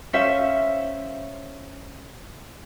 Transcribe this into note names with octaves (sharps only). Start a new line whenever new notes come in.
C#4 C5 E5 F5